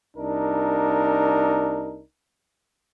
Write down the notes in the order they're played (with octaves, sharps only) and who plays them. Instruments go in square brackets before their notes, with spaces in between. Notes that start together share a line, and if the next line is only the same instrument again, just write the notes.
[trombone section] C2 D4 D#4 A#4